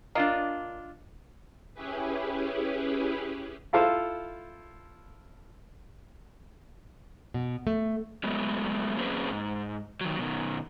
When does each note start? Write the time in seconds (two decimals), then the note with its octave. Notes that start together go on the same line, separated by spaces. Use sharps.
0.15 A#3 D4 F4 D#5
1.74 C#4 E4 G4 G#4 B4
3.73 E4 F4 A4 C5 F5
7.34 B2
7.67 A3
8.24 F#3 G#3 A3 B3
8.97 F#3 A#3 C4 C#4 G#4 B4
9.31 G#2
10.01 D#3 F#3
10.19 B2 D#3